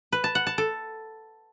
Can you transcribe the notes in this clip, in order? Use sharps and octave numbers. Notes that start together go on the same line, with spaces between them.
B4
A5
F#5
A5
A4